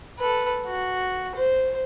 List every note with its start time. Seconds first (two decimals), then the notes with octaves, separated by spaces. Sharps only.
0.19 A4 B4
0.67 F#4
1.36 C5